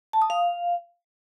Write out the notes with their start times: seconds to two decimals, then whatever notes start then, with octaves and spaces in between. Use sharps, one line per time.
0.13 A5
0.22 D#6
0.30 F5